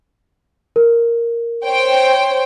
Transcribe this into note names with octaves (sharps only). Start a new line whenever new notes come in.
A#4
C5 C#5 G5